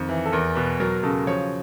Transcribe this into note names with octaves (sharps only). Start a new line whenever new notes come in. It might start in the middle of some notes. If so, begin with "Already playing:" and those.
Already playing: F2 D#3
E3
A4
E2 A#4
B2 B4
F#3 A#4
C#3 A4
F3 C#5